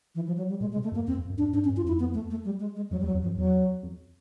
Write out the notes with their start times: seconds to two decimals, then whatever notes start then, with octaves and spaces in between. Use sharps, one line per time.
0.15 E3
0.27 F3
0.38 F#3
0.49 G3
0.60 A#2 G#3
0.72 G#3
0.77 C3
0.84 A3
0.92 F#2
0.95 A#3
1.07 F2 C4
1.18 F2
1.30 F#2
1.38 D4
1.42 F#2
1.53 G#2 D4
1.64 C#4
1.69 G2
1.77 F4
1.84 F2 E4
2.00 B3
2.14 A3
2.30 A3
2.45 G3
2.60 G#3
2.76 G#3
2.91 F2 F#3
3.01 E2 G3
3.07 F#3
3.14 F2
3.23 F3
3.26 F#2
3.37 E2 F#3
3.83 F2